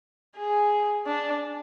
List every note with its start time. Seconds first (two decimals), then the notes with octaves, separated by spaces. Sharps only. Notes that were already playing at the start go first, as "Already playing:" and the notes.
0.36 G#4
1.07 D4